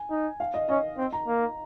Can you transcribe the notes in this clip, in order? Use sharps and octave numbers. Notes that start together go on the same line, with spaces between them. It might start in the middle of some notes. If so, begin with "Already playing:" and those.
Already playing: G#5
D#4
F5
D#5
C#4 D#5
C4
A#5
A#3